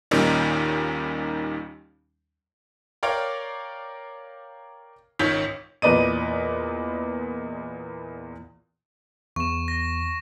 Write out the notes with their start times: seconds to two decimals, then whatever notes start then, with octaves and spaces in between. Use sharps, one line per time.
0.11 D#2 A#2 D#3 G3 C#4 D#4
3.03 A#4 C#5 D5 F5 G5
5.19 G#1 C#2 D#3 C#5 G6 B6
5.82 E2 A#2 B4 D5 D#5 D#7
9.36 E2 C#6 E7
9.68 A#6